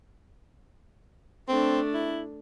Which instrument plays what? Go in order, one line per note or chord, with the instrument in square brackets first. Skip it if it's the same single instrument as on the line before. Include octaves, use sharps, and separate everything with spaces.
[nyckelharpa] A3 D4 [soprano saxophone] C4
[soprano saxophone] E4